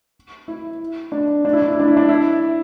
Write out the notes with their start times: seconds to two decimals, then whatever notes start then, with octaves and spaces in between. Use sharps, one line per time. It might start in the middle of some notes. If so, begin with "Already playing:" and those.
0.48 E4
1.12 D4
1.45 D4
1.53 E4
1.62 D4
1.71 E4
1.80 D4
1.88 E4
1.97 D4
2.09 E4